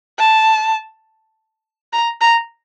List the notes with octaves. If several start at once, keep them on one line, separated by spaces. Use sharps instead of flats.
A5
A#5
A#5